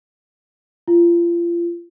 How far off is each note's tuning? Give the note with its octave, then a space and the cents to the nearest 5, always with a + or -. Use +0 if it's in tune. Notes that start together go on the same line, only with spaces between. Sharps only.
F4 -30